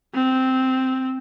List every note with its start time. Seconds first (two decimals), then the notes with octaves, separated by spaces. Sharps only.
0.15 C4